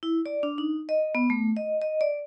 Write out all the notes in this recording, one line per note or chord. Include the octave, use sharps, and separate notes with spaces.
E4
D5
D4
D#4
D#5
B3
A3
D#5
D#5
D5